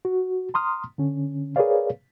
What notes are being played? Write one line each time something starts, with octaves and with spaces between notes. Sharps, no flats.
F#4
A#5 C6 D#6 F6
D3 C#4
G#4 A#4 B4 C#5 D5 F5